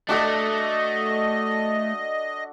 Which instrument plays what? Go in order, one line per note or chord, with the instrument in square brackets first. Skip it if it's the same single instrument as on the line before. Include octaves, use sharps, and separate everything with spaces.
[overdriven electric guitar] A3 [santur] D4 F#4 A4 [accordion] D#5